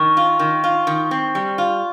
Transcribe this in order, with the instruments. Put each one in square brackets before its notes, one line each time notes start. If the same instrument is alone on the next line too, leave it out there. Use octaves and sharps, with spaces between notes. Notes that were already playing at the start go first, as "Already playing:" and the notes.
Already playing: [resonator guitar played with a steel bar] D#3 [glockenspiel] C#6
[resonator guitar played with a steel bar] F4
D#3
F4
D#3
C4
G3
F4